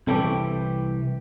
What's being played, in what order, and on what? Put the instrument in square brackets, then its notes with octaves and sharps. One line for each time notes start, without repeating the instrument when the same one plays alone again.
[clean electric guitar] C2 E3 G4 [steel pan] C4 A4 C#5